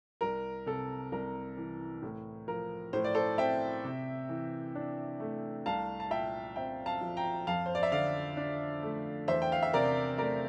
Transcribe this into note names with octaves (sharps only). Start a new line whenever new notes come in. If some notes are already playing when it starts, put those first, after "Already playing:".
C2 A#4
C3 A4
C2 A#4
E3
A2
F3 A#4
A2 C5
D5
A4 C5
C4 E5 G5
C3
E3
D4
A3
C2 F5 A5
A5
A#2 E5 G5
C4 E5 G5
F5 A5
F3
G5 A#5
F2 F5 A5
C5
D5
E5
D3 D5 F5
D4
A3
E2 C5 E5
G5
F5
E5
C3 A#4 D5
A3 A#4 D5